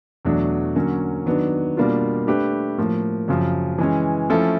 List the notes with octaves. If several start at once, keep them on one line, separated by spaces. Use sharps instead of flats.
E2 B2 F#3 A3 D4
D3 F#3 A#3 C#4
D#3 F#3 B3 D4
B2 G3 A#3 D4 F4
A3 D4 G4 B4
A2 F3 A#3
F#2 C#3 F3
E3 G#3 C#4
F3 A3 C#4 E4 A4